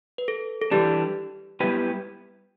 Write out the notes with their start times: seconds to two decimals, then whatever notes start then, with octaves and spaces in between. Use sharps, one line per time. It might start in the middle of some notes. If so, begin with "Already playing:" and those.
0.18 B4
0.28 A4
0.62 A4
0.71 E3 G3 D4 G4
1.60 G3 B3 E4 G4 B4